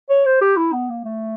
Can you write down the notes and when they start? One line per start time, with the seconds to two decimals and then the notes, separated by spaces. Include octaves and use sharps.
0.10 C#5
0.26 C5
0.41 G4
0.57 E4
0.73 B3
0.90 A#3
1.04 A3